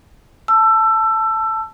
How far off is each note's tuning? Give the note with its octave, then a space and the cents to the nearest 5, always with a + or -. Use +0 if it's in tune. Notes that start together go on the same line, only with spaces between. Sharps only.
A5 +0 E6 +20